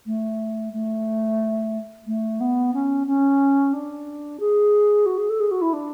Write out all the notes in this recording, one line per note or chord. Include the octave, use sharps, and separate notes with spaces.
A3
A3
A3
B3
C#4
C#4
D4
G#4
F#4
G#4
A4
G#4
F#4
E4
D4